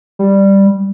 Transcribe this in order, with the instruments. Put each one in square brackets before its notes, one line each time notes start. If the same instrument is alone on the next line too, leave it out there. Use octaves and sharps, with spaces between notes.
[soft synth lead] G3